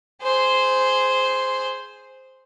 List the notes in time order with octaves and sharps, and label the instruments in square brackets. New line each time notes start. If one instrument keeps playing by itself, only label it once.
[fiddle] G#4 C5